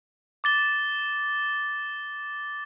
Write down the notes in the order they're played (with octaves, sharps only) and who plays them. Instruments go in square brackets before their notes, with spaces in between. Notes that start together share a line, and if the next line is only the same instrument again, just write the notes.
[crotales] D6 A6 G7